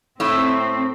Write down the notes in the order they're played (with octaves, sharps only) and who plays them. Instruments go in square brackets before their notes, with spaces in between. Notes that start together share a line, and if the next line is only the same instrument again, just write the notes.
[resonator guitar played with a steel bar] A2 E4 [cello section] C4